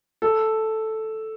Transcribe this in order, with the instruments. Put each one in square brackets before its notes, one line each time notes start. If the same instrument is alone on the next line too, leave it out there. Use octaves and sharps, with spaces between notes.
[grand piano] A4